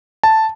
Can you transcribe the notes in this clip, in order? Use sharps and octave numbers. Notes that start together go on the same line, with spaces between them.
A5